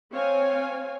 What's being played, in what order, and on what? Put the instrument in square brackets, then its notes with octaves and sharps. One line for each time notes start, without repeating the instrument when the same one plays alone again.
[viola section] C4 C#5 F5 G#5